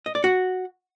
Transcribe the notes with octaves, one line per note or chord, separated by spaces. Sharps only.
D#5
D5
F#4